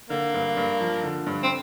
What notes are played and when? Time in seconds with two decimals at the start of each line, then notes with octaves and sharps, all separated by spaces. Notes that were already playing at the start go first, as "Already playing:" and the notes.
0.10 D3 A#3
0.34 G2
0.57 G2
0.80 F3
1.03 D3
1.27 G2
1.43 C4